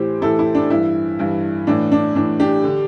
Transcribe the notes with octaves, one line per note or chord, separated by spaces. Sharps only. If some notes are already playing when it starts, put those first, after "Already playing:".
Already playing: A2 E3 G4 C5
A2 E3 E4 A4
E4
D4
G2 E3 E4
G2 E3
A2 E3 D4
D4
A2 E3 D4
D4 G4
D3